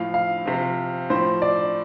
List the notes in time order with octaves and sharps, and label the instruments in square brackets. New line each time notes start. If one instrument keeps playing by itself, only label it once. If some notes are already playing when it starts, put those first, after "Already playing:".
Already playing: [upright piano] A2 F3 F5
F5
C3 F3
A2 F3 C5
D5